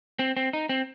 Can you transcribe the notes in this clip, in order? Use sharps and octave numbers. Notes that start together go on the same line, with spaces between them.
C4
C4
D#4
C4